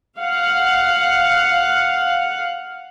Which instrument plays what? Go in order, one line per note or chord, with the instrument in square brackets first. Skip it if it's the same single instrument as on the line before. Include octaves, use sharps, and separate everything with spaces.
[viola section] F5 F#5